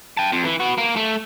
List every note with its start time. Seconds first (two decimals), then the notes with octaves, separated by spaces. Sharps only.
0.17 G5 A5
0.32 F2
0.45 E3
0.60 B3 F#4
0.78 A#3
0.96 A3